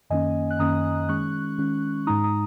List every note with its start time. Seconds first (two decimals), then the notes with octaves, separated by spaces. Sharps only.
0.10 F#2 D#3 A#3 C#4 D#5 G#5
0.50 F#6
0.59 F#2 D#3 A#3 C#4 A#5 D#6
1.09 D#3 G#3 C#4 C#6 F#6
1.58 D#3 G#3 C#4
2.07 G#2 G#3 D#4 A#5 D#6
2.24 A#5 D#6